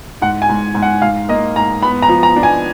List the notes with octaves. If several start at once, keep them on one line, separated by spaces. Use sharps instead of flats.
G#2 F#5
G#5
G#2
G#2
F#5
G#2 F5
A#3 D#5
G#2 A#5
B3 B5
A#5
F3
A#5
D4
G#5